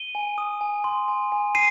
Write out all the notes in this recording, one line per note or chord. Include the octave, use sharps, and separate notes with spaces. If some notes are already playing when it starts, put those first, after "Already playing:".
Already playing: D#7 G7
G#5
D#6
G#5
C6
G#5
G#5
G#5 C7 D#7